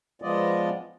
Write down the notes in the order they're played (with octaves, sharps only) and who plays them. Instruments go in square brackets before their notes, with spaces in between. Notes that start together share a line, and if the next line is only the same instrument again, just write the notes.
[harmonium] F3 G#3 B3 F4 D5 D#5